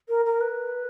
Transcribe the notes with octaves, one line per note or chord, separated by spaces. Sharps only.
A#4
A#4
B4